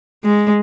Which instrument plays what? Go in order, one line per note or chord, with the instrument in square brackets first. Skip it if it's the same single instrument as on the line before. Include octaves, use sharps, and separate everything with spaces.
[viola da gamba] G#3